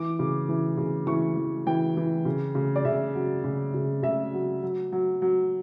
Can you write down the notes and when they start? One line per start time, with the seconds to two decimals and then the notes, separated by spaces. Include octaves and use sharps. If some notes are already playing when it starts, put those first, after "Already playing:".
Already playing: E3 D6
0.19 C#3
0.49 E3
0.77 C#3
1.07 E3 C#6
1.37 E3
1.67 E3 G5
1.97 E3
2.25 C#3
2.55 C#3
2.76 D5
2.85 C#3 E5
3.15 F#3
3.44 C#3
3.74 C#3
4.03 C#3 E5
4.34 F#3
4.63 F#3
4.92 F#3
5.22 F#3